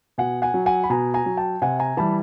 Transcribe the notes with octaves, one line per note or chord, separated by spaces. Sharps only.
B2 F#5 G#5
F#5 G#5
F#3
F#5 G#5
B5
B2 G#5 A#5
G#5 A#5
F#3
G5 A5
C3 F#5 G#5
G#5 A#5
E3 G3 A5 B5